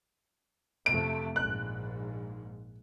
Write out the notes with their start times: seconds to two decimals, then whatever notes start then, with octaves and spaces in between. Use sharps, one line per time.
0.86 F2 C3 A3 D7
1.36 A#1 G#2 F#6